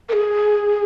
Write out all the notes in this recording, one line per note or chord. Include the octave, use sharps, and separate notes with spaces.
A#4
G#4